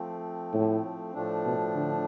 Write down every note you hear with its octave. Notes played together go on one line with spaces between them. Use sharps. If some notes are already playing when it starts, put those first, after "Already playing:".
Already playing: F3 A3 C4
A2
A2 F3 A3 D4
B2
D3